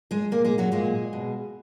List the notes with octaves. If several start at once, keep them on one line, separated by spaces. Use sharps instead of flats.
G#3 G#4
A#2 A#3 A#4
G#3 G#4
F#3 F#4
A#2 G#3 G#4
B2